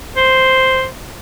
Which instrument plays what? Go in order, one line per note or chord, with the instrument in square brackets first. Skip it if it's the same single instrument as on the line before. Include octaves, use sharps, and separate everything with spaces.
[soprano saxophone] C5